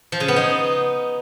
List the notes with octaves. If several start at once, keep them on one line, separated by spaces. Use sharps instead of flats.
F3
C#3
B3
D#4